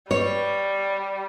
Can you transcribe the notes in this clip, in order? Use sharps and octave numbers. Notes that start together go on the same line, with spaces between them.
G3 C#5